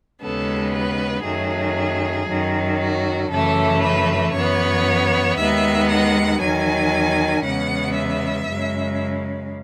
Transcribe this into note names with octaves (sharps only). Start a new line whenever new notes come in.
D#2 C#3 G#3 B3 A4
B4
F#2 D#3 F#3 A3 G#4
F#2 D#3 F#3
F#4
F#2 C#3 E3 A3 A4
B4
F#2 E3 B3 C#5
D#2 D#3 G#3 B3 E5
F#5
E2 D#3 F#3 G#5
E2 C#3 G#3 B3 F#5
E5
F#2 C#3 G#3